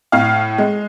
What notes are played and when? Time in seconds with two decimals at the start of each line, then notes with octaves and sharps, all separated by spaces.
0.12 A2 F5
0.58 G#3